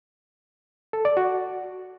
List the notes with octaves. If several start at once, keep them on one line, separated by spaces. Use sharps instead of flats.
A4
D5
F#4